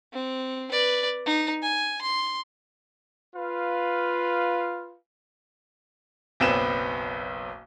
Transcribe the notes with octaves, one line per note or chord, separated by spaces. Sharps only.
C4
B4 D5
D#4
G#5
C6
F4 B4 F5
F#1 B1 B3 C4 E7